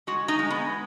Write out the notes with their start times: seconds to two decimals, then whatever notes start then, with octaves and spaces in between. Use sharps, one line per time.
0.07 G#3 F#4
0.28 D#4
0.39 G#3
0.50 B3